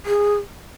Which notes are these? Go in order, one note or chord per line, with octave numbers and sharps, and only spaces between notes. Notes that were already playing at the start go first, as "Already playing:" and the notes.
G#4